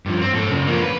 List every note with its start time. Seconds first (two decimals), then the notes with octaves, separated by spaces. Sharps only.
0.06 G2 F3
0.21 C4
0.33 G#2 A4
0.50 F#2 C#3
0.67 F3 A#3
0.82 B4